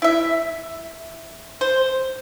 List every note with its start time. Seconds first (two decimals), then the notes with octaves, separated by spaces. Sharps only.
0.02 E4 E5
1.61 C5